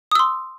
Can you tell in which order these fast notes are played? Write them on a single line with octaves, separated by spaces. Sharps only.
D#6 E6 C6